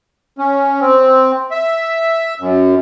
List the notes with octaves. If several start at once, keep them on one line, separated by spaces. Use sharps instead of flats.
C#4
C4
E5
F#2